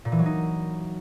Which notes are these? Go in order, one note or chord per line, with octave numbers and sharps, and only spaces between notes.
A#2
E3
F#3
D#4